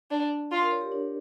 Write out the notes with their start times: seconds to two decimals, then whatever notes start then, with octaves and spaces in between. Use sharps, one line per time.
0.11 D4
0.51 F4 D5
0.61 A#4
0.71 C#5
0.81 G4
0.92 D4